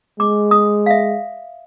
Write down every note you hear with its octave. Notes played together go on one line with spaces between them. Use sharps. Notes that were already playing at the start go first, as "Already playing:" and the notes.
G#3 D6
D#6
E5 F5